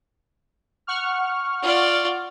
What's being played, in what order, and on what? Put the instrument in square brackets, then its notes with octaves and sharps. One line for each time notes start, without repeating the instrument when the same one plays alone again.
[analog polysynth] F#5 C#6 F6
[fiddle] F4 D5